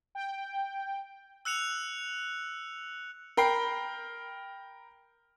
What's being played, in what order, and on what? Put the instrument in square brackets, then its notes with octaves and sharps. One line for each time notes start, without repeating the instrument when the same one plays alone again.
[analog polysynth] G5
[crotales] E6 F#6 C#7 F7
[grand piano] A#4 G5 B5 C7